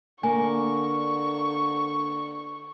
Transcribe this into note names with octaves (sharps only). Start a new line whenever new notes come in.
D3 A#3 G#5 C#6